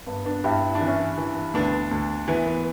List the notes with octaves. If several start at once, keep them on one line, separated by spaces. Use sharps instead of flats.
G2 B3
B3 D4
G2 E4 G4
E4
D4
E3
C#4 E4
E3
D2 B3 D4
D2
E3 B3
B3